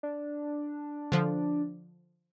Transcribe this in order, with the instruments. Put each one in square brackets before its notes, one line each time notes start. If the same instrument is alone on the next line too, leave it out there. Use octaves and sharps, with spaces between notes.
[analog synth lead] D4
[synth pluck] D3 F3